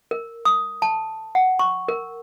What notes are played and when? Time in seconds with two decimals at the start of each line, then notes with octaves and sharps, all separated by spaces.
0.11 A#4
0.45 D#6
0.82 A5
1.35 F#5
1.59 C#6
1.88 A#4